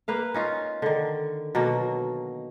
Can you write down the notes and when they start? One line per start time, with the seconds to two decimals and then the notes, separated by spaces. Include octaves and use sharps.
0.08 A#3 B4 F5
0.34 C#4 D#4 F4
0.82 D3 D#3
1.55 B2 F#3 A#3